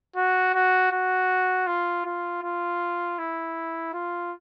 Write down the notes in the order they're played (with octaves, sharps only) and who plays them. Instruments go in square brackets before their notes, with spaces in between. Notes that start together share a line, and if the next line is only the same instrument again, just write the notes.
[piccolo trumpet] F#4
F#4
F#4
F4
F4
F4
E4
F4